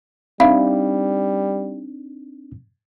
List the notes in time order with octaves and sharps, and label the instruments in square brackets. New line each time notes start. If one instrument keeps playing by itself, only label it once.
[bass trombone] G3 [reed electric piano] C4 D4 D#4 [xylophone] E5 F5 B5